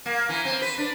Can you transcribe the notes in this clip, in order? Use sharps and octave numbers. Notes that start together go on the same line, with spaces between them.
A#3
E3
C4
B4
D4